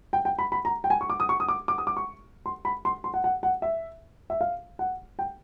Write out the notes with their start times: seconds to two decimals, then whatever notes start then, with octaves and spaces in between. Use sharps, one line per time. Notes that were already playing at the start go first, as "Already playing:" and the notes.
0.13 G5
0.25 G5
0.39 B5
0.52 B5
0.65 A#5
0.84 G5
0.90 G#5
1.01 C#6
1.10 D6
1.20 D#6
1.29 C#6
1.40 D#6
1.48 D6
1.68 D6
1.78 D#6
1.87 D6
1.97 C#6
2.46 C6
2.65 B5
2.85 C6
3.04 C6
3.14 F#5
3.24 F#5
3.43 F#5
3.62 E5
4.30 E5
4.41 F5
4.79 F#5
5.19 G5